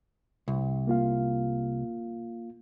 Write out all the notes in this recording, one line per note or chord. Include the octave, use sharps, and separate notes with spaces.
C2
A#3 F4 F5